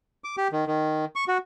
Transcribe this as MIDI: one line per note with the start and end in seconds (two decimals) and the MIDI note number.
0.24 0.36 86
0.37 0.48 67
0.52 0.65 51
0.66 1.05 51
1.16 1.24 85
1.28 1.38 66